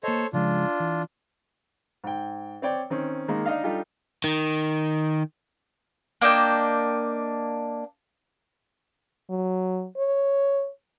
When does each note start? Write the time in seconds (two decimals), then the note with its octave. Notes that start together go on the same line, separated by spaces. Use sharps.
0.03 A#3 A4 C5 C#5 D#5
0.33 C#3 F3 G#3 D4 F4
0.80 E3
2.04 G#2 G5
2.62 C4 C#5 D5 G5
2.90 D#3 C4 C#4
3.28 D#3 G#3 A#3
3.46 D4 D#4 D#5 F5
3.63 G3 D4 D#4 F4 G4 A4
4.24 D#3
6.21 A#3 D4 D#5 G5
9.30 F#3
9.97 C#5